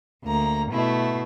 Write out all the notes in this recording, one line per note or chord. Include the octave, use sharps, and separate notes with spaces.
D2 A#3 A#5
B2 A3 E4